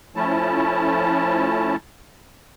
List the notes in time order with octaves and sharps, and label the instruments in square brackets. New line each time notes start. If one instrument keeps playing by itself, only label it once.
[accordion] F3 A3 C#4 E4 A5